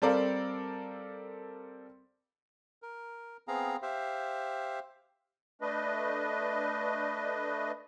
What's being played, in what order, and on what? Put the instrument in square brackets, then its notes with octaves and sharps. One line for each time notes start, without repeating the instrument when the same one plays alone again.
[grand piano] G3 C4 A4 A#4 D5 F5
[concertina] A#4
B3 C4 G#4 F5 A#5
G4 C5 E5 F5
[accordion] A3 D4 B4 D#5